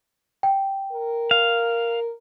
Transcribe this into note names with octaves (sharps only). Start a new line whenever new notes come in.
G5
A#4
F5